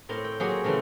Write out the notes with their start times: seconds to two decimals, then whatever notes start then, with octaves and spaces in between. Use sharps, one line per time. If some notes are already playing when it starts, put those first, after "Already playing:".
0.09 A2 C4 A#4 C#5
0.24 G5
0.40 F#3 A#3 C4 G4 G#4 C#5
0.64 C#3 E3 A3 C4 A#4